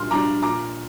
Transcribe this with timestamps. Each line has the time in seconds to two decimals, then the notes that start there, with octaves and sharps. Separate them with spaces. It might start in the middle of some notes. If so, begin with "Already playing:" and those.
Already playing: A#2 G3 D4 C6 F6
0.11 G3 D4 A#5 D6
0.42 A#2 A#5 D6